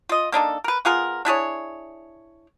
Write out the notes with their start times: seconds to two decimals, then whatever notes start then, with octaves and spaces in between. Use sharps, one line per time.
0.09 F4 D#5
0.32 A#3 D4 D#4 A4
0.64 A#4 B4
0.85 B3 F4 G#4 A#4
1.25 D4 E4 G#4 C#5